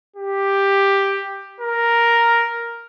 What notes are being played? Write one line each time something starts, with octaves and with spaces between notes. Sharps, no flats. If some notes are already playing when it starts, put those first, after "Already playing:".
G4
A#4